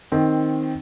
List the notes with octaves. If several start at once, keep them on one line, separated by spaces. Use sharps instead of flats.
D#3 C4